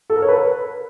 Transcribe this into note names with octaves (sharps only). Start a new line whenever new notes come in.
A4
A#4
C#5
B4